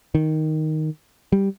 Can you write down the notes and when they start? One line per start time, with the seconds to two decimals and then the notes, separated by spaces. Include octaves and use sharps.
0.15 D#3
1.32 G3